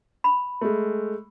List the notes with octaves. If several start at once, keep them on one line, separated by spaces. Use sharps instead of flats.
B5
G#3 A3